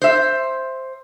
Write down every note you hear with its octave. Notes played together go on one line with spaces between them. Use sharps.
C5 E5